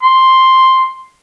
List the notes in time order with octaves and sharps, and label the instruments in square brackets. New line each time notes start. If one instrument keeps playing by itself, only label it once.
[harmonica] C6